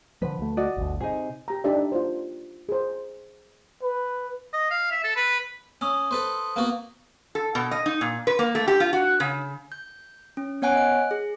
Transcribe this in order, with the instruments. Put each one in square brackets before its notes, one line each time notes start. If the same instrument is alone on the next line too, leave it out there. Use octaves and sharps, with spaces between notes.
[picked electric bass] D3 F3 [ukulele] B4
[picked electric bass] D2 A3
[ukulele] F#4 D5 D#5
[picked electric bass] G1 D2
[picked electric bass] C3 [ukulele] D#4 G#4
[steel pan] G4 A#5
D4 D#4 G4 A4 D5 E5
F4 C5
G#4 C5
[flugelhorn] B4
[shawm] D#5
F5
E5
A4
B4
[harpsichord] C#4 [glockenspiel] D#6 E6
[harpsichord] A4 B4 C5
A#3 B3 F#4
[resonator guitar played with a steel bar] A4
B2
D#5
D#4
A#2
B4
A#3
A3
G4
F4
F#4
C#3
[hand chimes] G6
C#4
B3 C#5 F#5 G#5 F#6 D7
D#5 F#6
G#4